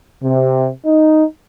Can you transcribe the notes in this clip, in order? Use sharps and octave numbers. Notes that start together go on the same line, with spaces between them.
C3
D#4